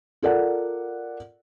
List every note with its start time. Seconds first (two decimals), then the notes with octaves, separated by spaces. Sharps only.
0.22 F4 A4 A#4 D5 F#5